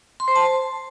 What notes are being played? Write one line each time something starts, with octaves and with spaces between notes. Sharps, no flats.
C6
C5
A5